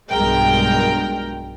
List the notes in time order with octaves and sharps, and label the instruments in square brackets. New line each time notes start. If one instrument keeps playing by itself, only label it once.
[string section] B1 G2 G#3 A#4 G5